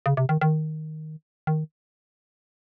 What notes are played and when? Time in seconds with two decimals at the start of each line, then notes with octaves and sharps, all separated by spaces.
0.06 C#3
0.17 C3
0.29 D#3
0.41 D#3
1.47 D#3